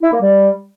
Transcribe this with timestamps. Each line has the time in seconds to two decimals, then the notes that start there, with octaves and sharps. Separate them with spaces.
0.02 E4
0.12 A#3
0.21 G3